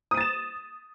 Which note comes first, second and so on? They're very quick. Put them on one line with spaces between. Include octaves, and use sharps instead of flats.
D#6 D#7 A6 E7